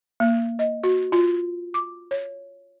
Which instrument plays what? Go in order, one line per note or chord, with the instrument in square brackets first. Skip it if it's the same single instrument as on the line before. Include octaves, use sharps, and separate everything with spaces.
[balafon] A#3
D#5
F#4
F4
D6
C#5